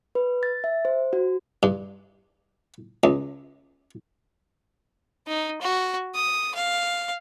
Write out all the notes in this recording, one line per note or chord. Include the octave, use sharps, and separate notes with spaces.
B4
A6
E5
C5
F#4
G2
C#2
D#4
F#4
D#6
F5